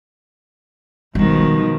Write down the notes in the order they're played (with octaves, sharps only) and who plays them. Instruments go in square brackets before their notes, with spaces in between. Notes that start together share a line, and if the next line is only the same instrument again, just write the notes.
[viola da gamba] B2 D#3 F3 [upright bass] G3 G#3